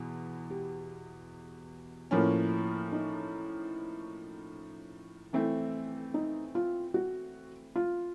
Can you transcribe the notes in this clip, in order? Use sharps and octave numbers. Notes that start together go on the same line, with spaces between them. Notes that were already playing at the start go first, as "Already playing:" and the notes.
Already playing: E2 B2
G4
A2 F3 A#3 C#4
D#4
E3 A3 C4 E4
D#4
F4
F#4
F4